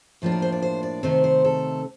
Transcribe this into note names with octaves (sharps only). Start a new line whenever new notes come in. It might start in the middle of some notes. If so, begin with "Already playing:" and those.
A2 F3 A#3 D4
A#4
C5
D5
C5
D5
C3 D#3 A3 C4 C5
C5
A4